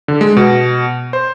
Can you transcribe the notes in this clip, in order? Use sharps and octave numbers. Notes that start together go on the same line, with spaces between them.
D3
G#3
B2
C5